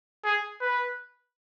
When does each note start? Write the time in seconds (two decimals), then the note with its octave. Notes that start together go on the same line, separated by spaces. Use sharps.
0.24 G#4
0.61 B4